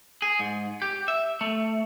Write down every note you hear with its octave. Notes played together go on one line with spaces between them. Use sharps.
G#4
G#2
G4
E5
A3